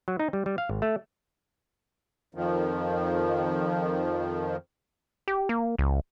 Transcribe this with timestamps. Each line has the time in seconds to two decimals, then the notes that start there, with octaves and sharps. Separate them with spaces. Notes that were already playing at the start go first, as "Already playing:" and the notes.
0.08 F#3
0.19 D#4
0.33 G3
0.46 G3
0.58 F5
0.69 G#1
0.82 A3
2.35 F2 D#3 F3
5.28 G4
5.49 A#3
5.78 C#2